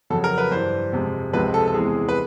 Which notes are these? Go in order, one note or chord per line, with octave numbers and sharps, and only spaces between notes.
F2 C#3 F#3 A4
A#4
B4
G2 E3 G3 C5
F2 C3 F3 G#3
C#2 C3 F3 G#3 B4
A4
A4
E2 C3 E3 G#3 G#4
B4